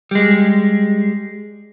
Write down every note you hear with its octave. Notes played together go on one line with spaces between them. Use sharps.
G3 G#3